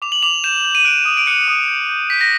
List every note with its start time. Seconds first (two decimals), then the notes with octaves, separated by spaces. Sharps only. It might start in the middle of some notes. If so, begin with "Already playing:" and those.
0.02 D6 F7
0.12 F#7
0.23 D6 F7
0.44 G6 E7
0.64 G6
0.75 D#7
0.85 F#6 D7
1.05 D#6
1.17 D7
1.27 F#6 C#7
1.48 D#6
1.68 G6
1.89 G6
2.10 G6 B6
2.21 A#6